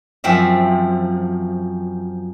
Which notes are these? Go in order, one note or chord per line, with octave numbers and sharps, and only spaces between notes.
F#2 F3 C4 E5